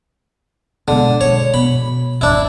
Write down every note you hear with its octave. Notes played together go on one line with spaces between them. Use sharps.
B2 D3 G#3
F3 G#3 C#5
B2 B5
G#1 E2 D4 E4